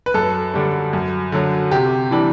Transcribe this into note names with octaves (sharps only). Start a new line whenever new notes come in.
B4
F#2 A4
D3 G3 D4
F#2
D3 F#3
C3 G4
E3 G3 D4